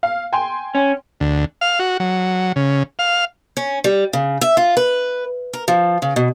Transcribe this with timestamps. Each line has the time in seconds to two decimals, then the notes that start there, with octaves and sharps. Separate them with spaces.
0.03 F5
0.33 G5 G#5 C6
0.75 C#4
1.20 D2
1.61 F5
1.79 F#4
2.00 F#3
2.56 C#3
2.99 F5
3.57 C#4
3.84 G3
4.13 C#3
4.41 E5
4.57 F4
4.77 B4
5.53 A#4
5.68 F3
6.02 C#3
6.16 B2